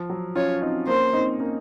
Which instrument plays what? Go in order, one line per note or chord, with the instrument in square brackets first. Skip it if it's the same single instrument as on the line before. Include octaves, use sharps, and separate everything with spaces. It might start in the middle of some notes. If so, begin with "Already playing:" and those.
Already playing: [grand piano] F3
F#3
[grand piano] C#4 F4 [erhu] C#5
[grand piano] C4 D#4
[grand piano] A#3 C#4 [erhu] C5
[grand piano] C4 D#4
A#3 C#4